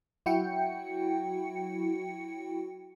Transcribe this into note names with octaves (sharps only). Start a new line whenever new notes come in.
F#3 E4 F#4 G5 C#7